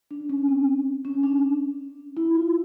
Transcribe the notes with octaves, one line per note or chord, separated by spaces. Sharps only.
D4
C#4
C4
C#4
D4
E4
F4